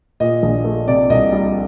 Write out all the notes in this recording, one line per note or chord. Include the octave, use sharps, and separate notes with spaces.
A#2 D#5
A#1
A3
C3 D5
C2 D#5
G3 D#5